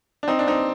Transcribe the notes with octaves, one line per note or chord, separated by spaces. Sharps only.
D4
C4 D#4
D4
C4 D#4